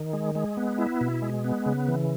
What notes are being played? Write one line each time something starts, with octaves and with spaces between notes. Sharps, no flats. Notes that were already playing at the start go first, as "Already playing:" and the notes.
Already playing: D#3
G#3
G#3
B3
E4
B2
G#3
B3
C#3
E3